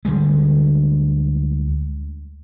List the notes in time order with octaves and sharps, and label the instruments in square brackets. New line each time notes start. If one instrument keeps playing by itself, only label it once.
[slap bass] D2 D3 G3 G#3